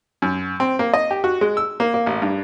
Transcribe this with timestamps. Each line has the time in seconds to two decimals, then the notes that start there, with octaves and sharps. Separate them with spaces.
0.22 F#2
0.60 C4
0.79 A#3
0.94 D#5
1.11 G4
1.24 F#4
1.41 G#3
1.57 E6
1.80 A#3
1.94 A#3
2.06 A1
2.22 G2